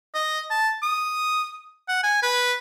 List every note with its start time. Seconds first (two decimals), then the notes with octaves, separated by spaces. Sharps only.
0.14 D#5
0.50 A5
0.83 D#6
1.88 F#5
2.03 G#5
2.22 B4